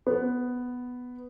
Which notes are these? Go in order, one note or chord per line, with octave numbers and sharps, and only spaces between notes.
B3